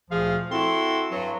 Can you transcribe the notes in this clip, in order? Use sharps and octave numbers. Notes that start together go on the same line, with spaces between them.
D2 A#2 F3 G#4 F5
C4 E4 F#4 A4 C6
G2 F#3